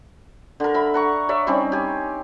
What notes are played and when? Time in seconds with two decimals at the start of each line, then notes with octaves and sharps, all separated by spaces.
0.60 D3 A#4
0.74 E5 B5
0.94 F#5 A#5 C#6
1.29 C#5 D5 E5
1.47 G3 C4 C#4 D#4
1.72 G4 G#5